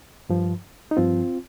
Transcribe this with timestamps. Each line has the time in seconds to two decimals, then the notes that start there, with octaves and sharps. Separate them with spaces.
0.30 G2 F3
0.91 D#4
0.97 G2 F3 C4 F4